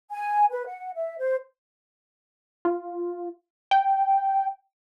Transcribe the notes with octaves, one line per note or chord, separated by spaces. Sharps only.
G#5
B4
F#5
E5
C5
F4
G5